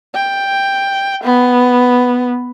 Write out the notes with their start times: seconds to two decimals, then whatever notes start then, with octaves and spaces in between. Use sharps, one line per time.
0.15 G5
1.24 B3